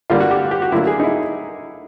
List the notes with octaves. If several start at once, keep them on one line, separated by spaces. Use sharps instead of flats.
D3 G3 A#3 F4
F#4
G4
G4
F#4
D3 F#3 A#3 E4
G#4
D#4
E4